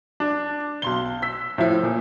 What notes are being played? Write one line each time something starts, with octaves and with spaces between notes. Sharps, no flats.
D4
B1 C6 G7
E6 B6
A2 F3 E4
A#2